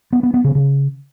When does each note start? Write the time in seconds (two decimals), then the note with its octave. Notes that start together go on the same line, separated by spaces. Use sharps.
0.13 B3
0.23 B3
0.34 B3
0.44 C#3
0.55 C#3